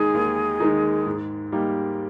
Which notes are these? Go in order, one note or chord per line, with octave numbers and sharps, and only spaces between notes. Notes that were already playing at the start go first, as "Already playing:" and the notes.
Already playing: D#2 D#3 G#3 D#4 G#4
D#2
D#3 G#3 D#4
G#2
G3 A#3 D#4 G4